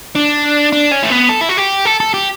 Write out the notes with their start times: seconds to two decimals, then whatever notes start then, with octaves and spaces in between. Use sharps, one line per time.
0.16 D4
0.73 D4
0.92 C#4
1.03 A3
1.10 B3
1.29 A4
1.41 E4
1.49 F#4
1.57 G4
1.85 A4
2.00 A4
2.14 G4